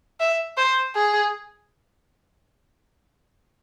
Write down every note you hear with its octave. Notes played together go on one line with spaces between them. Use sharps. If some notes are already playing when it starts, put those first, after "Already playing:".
E5
C5
G#4